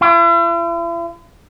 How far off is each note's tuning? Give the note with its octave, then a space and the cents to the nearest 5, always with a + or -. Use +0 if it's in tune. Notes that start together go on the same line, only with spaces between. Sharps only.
E4 +45